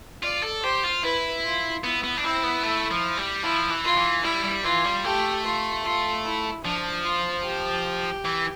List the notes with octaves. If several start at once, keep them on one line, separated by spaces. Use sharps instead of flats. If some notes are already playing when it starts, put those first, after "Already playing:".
F4 D5
A4
G4 C5
F4
E4 B4
F4
B3 E4
B3
D4
C4 E4
B3
A3
F3
G3
F3 E4
E3
F4
E3
G3 E4
G3
E3 F4
G3
A3 G4
F4
F4
E4
F3 D4
F4
G4
E3